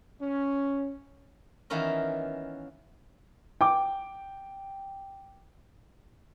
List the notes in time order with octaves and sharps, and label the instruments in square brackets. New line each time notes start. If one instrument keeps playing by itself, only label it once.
[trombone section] C#4
[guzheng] D#3 E3 A#3 B3 C#4 A#4
[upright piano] G5 D6